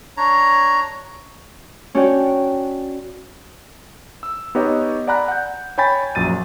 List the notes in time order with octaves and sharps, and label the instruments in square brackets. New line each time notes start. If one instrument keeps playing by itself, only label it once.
[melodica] D4 C#5 A#5
[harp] C#4 D4 F#4 C#5 D5 G5
[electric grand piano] E6
B3 D#4 G4 C#5 D#5
D5 F#5 G#5 A#5 B5 F#6
F#5 G6
C#5 G5 G#5 B5 G6 A6
A#1 F#2 A6 D#7